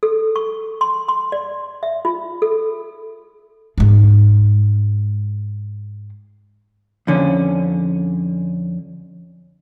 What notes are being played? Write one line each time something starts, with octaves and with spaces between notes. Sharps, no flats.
A4
C#6
C6
C6
D5
E5
F4
A4
G#2 G#3
F2 D3 C#4